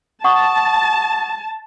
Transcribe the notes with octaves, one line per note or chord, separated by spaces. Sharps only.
F#5 A5 C#6 D#6